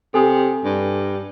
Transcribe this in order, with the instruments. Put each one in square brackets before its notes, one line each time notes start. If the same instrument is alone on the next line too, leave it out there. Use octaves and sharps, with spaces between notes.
[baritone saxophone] C3 [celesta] A4 G#5 D#6
[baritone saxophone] G2